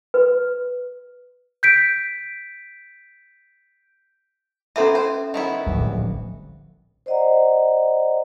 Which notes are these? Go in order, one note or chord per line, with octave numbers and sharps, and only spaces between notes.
B4
G6 B6 D7
B3 C#4 A4 A#4 C5 E5
C5
D#3 B3 E4
D1 A#1 G3
C5 D5 D#5 F#5 A#5